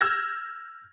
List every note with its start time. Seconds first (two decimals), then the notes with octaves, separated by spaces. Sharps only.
0.01 E6 F6 G6 G#6 A#6